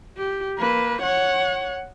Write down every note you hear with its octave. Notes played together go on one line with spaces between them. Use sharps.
G4
A#3 B4
C#5 F#5